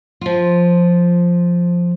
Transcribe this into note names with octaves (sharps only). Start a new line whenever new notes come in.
F3 F4